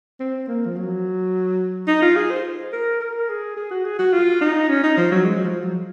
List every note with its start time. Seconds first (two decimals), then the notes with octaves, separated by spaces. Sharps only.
0.20 C4
0.48 A#3
0.66 F3
0.76 F#3
1.88 D#4
2.02 F4
2.16 G#4
2.30 C5
2.73 A#4
3.01 A#4
3.29 G#4
3.57 G#4
3.71 F#4
3.85 G#4
3.99 F#4
4.13 F4
4.41 D#4
4.69 C#4
4.83 D#4
4.97 F3
5.12 F#3
5.25 G#3
5.44 F3
5.63 F#3